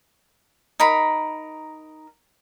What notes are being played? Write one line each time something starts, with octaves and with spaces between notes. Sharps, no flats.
D#4 A#4 B5